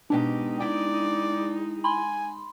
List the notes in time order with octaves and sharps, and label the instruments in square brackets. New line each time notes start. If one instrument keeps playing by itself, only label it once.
[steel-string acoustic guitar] G#2 B2 G4 [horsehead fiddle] G#3 D#4 [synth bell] D4
[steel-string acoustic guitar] E4 G5 [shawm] D5
[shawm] G#5 [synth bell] B5 C6